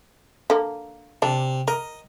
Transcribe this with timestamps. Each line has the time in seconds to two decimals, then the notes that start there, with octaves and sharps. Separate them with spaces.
0.50 D3 A#3
1.22 C3 D4
1.68 A#4 D#5